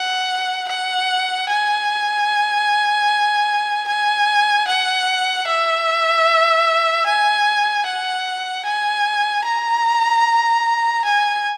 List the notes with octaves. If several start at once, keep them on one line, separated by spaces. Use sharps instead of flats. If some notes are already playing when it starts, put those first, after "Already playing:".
Already playing: F#5
F#5
G#5
G#5
F#5
E5
G#5
F#5
G#5
A#5
G#5